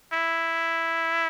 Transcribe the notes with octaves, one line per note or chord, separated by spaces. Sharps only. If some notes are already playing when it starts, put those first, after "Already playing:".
E4